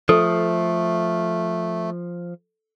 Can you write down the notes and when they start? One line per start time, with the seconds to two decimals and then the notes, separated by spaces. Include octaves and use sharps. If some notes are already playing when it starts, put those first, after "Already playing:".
0.09 F3 A3 A4